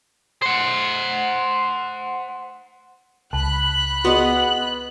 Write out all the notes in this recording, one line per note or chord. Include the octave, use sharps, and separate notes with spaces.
C5 F#5
C#2 A5 B5 F#6
B3 F#4 G#4 D#5